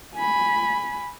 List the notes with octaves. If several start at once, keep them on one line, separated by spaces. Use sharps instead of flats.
G#5 B5